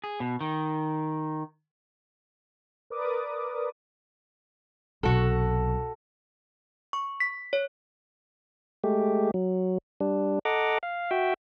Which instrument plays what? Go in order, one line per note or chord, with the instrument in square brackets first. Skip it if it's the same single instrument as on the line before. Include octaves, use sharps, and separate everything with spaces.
[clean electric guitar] G#4
B2
D#3
[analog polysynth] A#4 B4 D5 D6 D#6
[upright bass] B1 C3 [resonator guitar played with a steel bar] F#4 A4
[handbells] C#6
B6
C#5
[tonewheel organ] G#3 A3 G4
F#3
G3 D4
A4 D#5 F#5 A#5 D6
F5
F#4 E5 G5